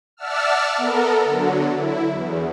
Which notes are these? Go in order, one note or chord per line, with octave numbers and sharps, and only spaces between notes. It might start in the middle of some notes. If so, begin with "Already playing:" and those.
D5 E5 F#5 A5 E6 F6
B3 A4 A#4
D3 F#3
E4
E2